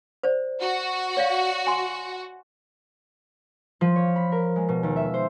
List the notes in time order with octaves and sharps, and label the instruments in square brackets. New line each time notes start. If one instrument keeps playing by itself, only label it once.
[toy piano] C5 D5
[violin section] F#4
[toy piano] C#5 D5 F5
G#5 C6
[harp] F3
C#5
B5
A#4
G#3
B2
D#2
E5
C5